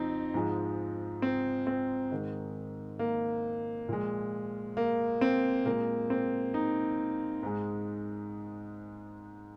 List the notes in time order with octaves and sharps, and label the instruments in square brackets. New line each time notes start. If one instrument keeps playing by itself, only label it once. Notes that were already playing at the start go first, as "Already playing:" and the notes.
Already playing: [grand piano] F2 F3 C4 D#4
G#2 F3 G#3
C4
C4
G#2 D#3 G#3
A#3
A#2 F3 G#3
A#3
C4
A#2 G#3 A#3
C4
D#4
G#2 G#3